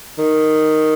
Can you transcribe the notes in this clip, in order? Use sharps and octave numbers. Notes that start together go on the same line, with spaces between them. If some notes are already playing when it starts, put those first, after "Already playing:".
D#3